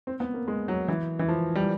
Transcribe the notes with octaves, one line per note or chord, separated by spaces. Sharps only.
C4
B3
A#3
G#3
F#3
E3
E3
F3
G3